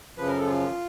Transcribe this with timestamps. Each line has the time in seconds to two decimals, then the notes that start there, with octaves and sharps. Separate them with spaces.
0.17 F#2 C#3 F3 B4
0.27 A#4
0.36 A4
0.46 F4